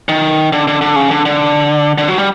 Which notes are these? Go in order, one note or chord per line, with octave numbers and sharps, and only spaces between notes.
D#3
D3
D3
D3
C#3
D3
D3
D3
F#3
G3